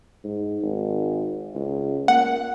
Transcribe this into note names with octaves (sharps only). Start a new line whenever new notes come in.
G#2
G#1
C#2
A#3 F#5